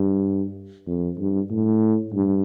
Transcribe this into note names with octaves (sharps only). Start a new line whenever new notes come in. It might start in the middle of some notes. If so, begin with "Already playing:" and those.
Already playing: G2
F2
G2
A2
G2